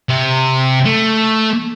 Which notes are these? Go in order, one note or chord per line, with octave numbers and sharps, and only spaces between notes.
C3
A3